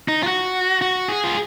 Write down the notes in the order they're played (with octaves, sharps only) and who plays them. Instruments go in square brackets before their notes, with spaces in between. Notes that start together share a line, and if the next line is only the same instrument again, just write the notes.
[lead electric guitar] D#4
F4
F#4
F#4
G#4
F4